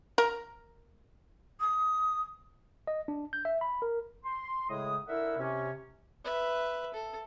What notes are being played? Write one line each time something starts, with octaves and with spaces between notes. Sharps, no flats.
A#4
D#6
D#5
D4
G6
E5
B5
A#4
C6
A2 C#3 G#3 D#6
D3 E4 A#4 E5 F#5 E6
C3 C#4
B4 E5
A4